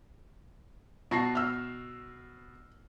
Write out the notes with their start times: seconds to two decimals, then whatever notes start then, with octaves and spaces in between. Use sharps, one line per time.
1.11 B2 A5 C#6 A#6 C7
1.35 E6 F6